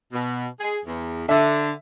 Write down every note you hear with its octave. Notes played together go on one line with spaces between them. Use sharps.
B2
G#4
E2
D3 E5